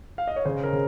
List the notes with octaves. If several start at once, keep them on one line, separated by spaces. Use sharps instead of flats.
F5
D#5
C#5
C#3 C5
A#4
C#3